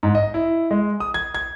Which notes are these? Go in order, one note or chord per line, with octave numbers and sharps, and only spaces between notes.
G#2
D#5
E4
G#3
D#6
G#6
G#6